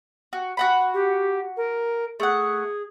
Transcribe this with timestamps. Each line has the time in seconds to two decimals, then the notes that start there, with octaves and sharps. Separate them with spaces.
0.33 F#4
0.57 F#4 F#5 B5
0.94 G4
1.57 A#4
2.20 A3 G#4 F#5